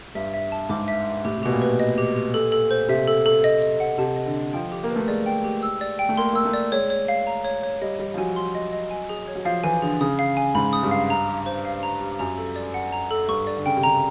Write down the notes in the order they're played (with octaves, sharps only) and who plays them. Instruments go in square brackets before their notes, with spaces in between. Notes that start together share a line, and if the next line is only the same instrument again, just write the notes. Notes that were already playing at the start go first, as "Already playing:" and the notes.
[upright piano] G2 [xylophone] E5
[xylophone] E5
A5
[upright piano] G#2 [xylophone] D6
[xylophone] E5
E5
[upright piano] A2 [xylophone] G4
[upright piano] C3
[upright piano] B2 [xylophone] G4
[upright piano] A#2
[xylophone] B4
D#5
G4
G4
A4
A4
C5
[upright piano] C3 [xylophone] E5
[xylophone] A4
A4
D#5
D#5
F#5
[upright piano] C3 [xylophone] A5
[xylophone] D#5
[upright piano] D3
[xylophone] D#5
[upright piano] F3 [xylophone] G5
[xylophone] G4
[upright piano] A#3
[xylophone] B4
[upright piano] A3
[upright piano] G#3 [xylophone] D5
[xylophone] G5
G4
E6
D5
G5
[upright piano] A3
[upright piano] A#3 [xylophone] C6
[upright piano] A#3 [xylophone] E6
[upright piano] A3
[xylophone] D5
[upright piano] G#3 [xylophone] C#5
[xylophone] C#5
F5
A#5
C#5
C#5
[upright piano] G3 [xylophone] D#5
[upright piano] G3 [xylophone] D#5
[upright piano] F3
[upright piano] F#3 [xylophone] G#5
[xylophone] C6
D#5
D#5
G#5
G#4
C#5
[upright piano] F#3
[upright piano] F3 [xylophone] F5
[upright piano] E3 [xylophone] G#5
[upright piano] D3 [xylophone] G#4
[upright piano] C#3 [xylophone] D#6
[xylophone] F5
G#5
[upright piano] G#2 [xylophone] B5
[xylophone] D#6
[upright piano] G2
[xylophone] F5
A#5
G4
C5
F5
A#5
G4
[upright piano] F#2 [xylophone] A#5
[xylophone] A4
D5
F#5
A#5
A4
[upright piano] G2 [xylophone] C#6
[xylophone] D5
[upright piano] D3
[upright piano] C#3 [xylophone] G5
[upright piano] C3
[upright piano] C#3 [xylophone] A#5